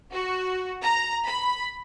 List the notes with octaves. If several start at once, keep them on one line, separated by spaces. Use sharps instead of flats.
F#4
A#5
B5